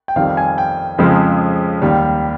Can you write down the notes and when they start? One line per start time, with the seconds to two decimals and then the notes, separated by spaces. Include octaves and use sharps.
0.08 G5
0.16 F2 D#3 G3 F5
0.37 G#5
0.58 G5
0.98 F2 C#3 F3 G#3
1.82 D#2 D#3 G3